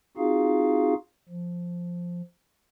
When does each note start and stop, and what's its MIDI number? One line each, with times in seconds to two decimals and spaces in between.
0.17 0.94 60
0.17 0.94 63
0.17 0.94 65
0.17 0.94 66
0.17 0.94 68
0.17 0.94 77
1.29 2.22 53